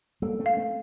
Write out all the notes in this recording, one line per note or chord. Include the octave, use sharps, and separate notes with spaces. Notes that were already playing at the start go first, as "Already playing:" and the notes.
G3 A#3 A4
A3 C4
F5
A3 C4